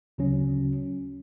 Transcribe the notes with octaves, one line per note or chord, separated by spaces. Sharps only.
D2 C#3 F#3 C#4